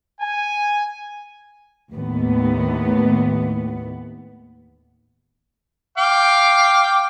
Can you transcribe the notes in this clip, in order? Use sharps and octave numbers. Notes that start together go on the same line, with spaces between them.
G#5
D#2 A2 B3
F5 G5 D6